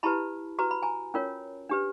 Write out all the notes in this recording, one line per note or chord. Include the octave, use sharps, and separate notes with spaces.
E4 G4 B4 A5 B5
F#4 B4 A#5
B5
G#5 A#5
C#4 F4 A#4 C#5
D4 G4 B4